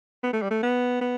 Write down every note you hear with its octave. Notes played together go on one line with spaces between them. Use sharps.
B3
A3
G3
A3
B3
B3